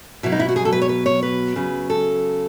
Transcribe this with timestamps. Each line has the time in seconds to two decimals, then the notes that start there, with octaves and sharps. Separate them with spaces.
0.23 B2 F#3 E4
0.32 D#4
0.40 E4
0.48 F#4
0.56 G#4
0.65 A4
0.73 B4
0.82 C#5
0.89 B4
1.06 C#5
1.23 B4
1.56 C#3 F#3
1.90 A4